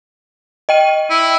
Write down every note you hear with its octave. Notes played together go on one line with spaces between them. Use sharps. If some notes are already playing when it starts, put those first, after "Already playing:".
D#5 G5 D#7
E4